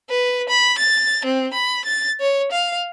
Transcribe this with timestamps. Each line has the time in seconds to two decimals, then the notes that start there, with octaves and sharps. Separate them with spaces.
0.10 B4
0.49 B5
0.78 A6
1.25 C4
1.53 B5
1.85 A6
2.20 C#5
2.52 F5